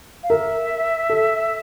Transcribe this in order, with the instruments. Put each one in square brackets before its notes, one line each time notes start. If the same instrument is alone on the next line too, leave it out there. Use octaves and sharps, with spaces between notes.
[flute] F5
[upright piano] A#4 [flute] E5
[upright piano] A4